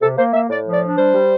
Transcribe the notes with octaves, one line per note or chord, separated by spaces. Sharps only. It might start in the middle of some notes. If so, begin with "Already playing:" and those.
C3 A4
A#3 C5
A#3 E5
A2 D5
F3
D5
D4
G3 C5
G3